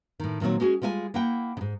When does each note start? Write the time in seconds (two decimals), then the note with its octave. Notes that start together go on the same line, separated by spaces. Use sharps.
0.20 A2 D#3
0.41 A#2 D#3 F#3 A3 C4 C#5
0.60 G#3 C#4 F#4 G#4
0.82 G3 G#3 F4 D5 G#5
1.14 A#3 E4 F#5 G5
1.57 G#2 C#3